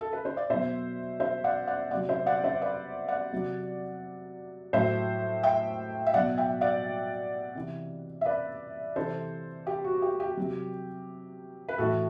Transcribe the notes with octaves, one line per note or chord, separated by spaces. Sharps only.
A4
B4
C5
D5
B2 F#3 C5 E5
C5 E5
D5 F#5
D5 F#5
C3 F#3 D5 F#5
C5 E5
D5 F#5
C5 E5
B4 D5
D5 F#5
C3 F#3
A2 F#3 C5 E5
E5 G5
E5
B2 F#3 D5 F#5
E5 G5
D5 F#5
C3 E3
E5
B4 D5
C3 E3 A4 C5
G4
F#4
G4
G4
C3 F#3
B4
A2 E3 F#4 A4